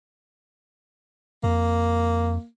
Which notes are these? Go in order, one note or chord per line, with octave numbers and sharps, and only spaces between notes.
F2 A#3